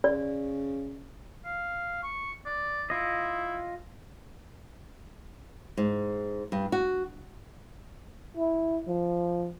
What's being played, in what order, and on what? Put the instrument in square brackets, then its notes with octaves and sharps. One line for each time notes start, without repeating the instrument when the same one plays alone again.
[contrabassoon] C#3 [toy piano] D5
[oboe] F5
C#6
D5
[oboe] E4 [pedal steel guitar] F4 D#5
[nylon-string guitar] G#2
G2
F#4
[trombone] E4
F3